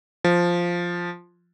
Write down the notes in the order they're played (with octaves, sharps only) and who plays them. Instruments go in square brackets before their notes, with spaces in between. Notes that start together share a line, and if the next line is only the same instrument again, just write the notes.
[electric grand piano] F3